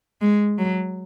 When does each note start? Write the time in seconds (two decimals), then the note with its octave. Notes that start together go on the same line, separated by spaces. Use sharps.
0.21 G#3
0.58 F#3